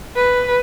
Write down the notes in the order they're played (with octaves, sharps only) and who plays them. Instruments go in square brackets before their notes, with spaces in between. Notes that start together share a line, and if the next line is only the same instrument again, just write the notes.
[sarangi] B4